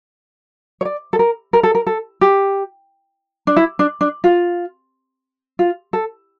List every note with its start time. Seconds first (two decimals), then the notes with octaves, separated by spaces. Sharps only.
0.81 C#5
0.85 D5
1.13 A4
1.19 A#4
1.53 A#4
1.63 A4
1.75 A#4
1.87 A4
2.21 G4
3.47 D4
3.56 E4
3.79 D4
4.01 D4
4.24 F4
5.59 F4
5.93 A4